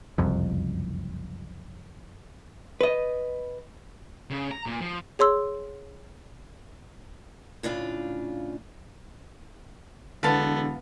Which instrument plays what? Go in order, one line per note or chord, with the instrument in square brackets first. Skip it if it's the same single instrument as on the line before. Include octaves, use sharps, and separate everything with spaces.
[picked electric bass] F#1 C2 F2
[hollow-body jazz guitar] B4 D#5
[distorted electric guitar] C#3
A#5
A#2
F3
[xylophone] G#4 C#5 C6 E6
[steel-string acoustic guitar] A2 C#3 D4 F4
[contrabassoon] E1 [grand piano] D3 [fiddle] B3 [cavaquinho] B4 F5 A5